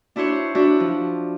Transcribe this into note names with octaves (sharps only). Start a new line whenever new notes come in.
D4 E4 F#4 C5 C#5
D4 E4 F#4
F3